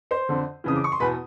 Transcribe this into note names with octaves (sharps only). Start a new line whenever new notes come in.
C5 C6
F2 D3
F2 C#3 E3 D#6
D6
C#6
C6
E2 B2 B4 B5